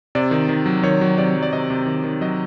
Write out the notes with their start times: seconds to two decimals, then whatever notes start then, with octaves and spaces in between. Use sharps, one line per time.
0.15 C3 D5
0.31 D#3
0.49 D#3
0.66 F#3
0.83 D#3 C#5
1.01 F#3
1.18 C3 D5
1.36 F#3
1.43 D5
1.53 C3 D#5
1.70 C3
1.86 D#3
2.04 D#3
2.21 F#3 D#5